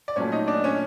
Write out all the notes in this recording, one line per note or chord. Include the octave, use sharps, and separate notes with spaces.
D5
A#2 F#3 A3 C#4 C#5
D#4 D#5
D4 D5
C#4 C#5